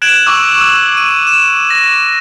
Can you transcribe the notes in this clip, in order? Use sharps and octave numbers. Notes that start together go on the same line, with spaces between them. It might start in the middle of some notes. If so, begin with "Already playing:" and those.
F#6 G#6 D7 E7 F#7
C#6 D6 E6
E6
D#7
E7
A#6